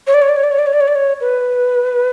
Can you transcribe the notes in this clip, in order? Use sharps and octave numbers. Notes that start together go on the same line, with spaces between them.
C#5
D5
C#5
D5
C#5
D5
C#5
D5
C#5
D5
C#5
D5
C#5
B4